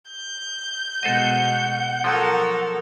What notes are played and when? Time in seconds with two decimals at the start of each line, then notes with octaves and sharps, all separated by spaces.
0.11 G6
1.03 B2 G#3 A4 C5 D#5 F#5
2.04 F3 F#3 A4 A#4